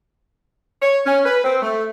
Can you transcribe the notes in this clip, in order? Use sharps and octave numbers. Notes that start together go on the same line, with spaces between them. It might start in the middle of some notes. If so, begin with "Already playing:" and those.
C#5
C#4
B4
C4
A3